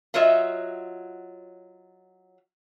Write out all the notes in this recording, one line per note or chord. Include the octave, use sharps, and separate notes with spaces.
F#3 F4 F#4 C#5 D#5 E5